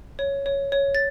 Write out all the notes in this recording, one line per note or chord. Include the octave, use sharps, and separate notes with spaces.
C#5
C#5
C#5
A6